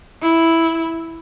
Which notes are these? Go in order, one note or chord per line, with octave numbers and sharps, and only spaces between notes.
E4